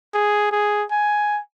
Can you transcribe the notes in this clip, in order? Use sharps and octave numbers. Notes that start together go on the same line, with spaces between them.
G#4
G#4
G#5